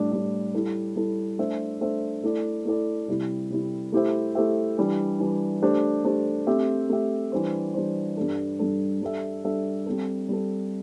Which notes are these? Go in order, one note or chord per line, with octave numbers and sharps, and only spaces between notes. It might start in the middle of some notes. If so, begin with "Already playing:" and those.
Already playing: A2 G3 D4
A2 G3 D4
G3 E4 A4
G3 E4 A4
A3 D4 C5 E5
A3 D4 C5 E5
A3 E4 A4 D5
A3 E4 A4 D5
C3 G3 E4
C3 G3 E4
A3 E4 G4 C5 E5
A3 E4 G4 C5 E5
E3 G3 D4
E3 G3 D4
A3 D4 G4 C5
A3 D4 G4 C5
A3 C4 G4 E5
A3 C4 G4 E5
E3 G3 D4 C5
E3 G3 D4 C5
G2 G3 D4 A4
G2 G3 D4 A4
G3 D4 A4 E5
G3 D4 A4 E5
G3 C4 A4
G3 C4 A4